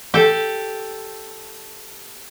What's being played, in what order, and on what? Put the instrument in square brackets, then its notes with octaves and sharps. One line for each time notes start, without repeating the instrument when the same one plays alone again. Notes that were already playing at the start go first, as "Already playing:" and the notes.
[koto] G4 A4